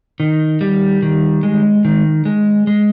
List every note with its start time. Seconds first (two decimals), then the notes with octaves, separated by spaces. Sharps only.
0.20 D#3
0.61 G3
1.03 D#3
1.43 G#3
1.85 D#3
2.25 G#3
2.67 G#3